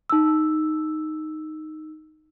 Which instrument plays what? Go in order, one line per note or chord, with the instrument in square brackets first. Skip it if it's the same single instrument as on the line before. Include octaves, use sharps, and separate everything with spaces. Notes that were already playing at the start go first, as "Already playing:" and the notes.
[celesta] D#4 E6